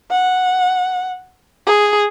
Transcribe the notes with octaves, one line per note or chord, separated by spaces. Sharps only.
F#5
G#4